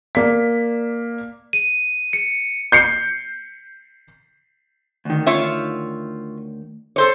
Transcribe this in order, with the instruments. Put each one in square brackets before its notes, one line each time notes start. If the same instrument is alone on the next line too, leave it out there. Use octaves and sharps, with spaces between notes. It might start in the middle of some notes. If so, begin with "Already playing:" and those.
[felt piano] A#3 D5 B6
[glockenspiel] D#7
C#7
[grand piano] G6 C7 C#7
[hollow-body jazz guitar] D2 D#3
[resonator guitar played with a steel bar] F4 C#5 E5
A4 C5 C#5